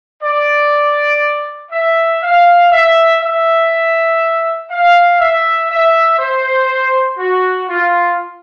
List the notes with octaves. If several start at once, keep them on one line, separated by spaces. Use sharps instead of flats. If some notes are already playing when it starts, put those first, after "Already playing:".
D5
E5
F5
E5
E5
F5
E5
E5
C5
F#4
F4